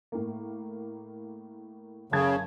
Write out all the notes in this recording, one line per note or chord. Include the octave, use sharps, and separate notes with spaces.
A2 A#3
F#1 C#3 A5 G#6